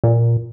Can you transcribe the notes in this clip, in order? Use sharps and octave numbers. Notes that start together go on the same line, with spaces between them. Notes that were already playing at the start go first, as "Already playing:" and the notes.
A#2